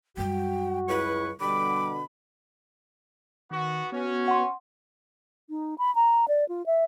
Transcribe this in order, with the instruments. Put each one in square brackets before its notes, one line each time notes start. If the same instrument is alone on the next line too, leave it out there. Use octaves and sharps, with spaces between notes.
[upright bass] F#2 G3 [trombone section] F#4 [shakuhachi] G5
[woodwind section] C#2 E4 C#6 [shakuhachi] B4
[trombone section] B2 D3 [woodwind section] G3 D6 [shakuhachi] B5
[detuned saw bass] D#3 [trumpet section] B3 F#4
[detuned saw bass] B3 [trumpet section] C#4 [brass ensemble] F#4
[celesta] F#5 C6
[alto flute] D#4
B5
A#5
D5
F4
E5